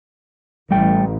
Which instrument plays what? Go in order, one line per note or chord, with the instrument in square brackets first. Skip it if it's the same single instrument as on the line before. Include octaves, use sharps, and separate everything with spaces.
[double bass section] A1 [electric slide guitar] G3 A3 G5